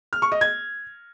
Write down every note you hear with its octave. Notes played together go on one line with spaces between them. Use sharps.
F6
C#6
D#5
G#6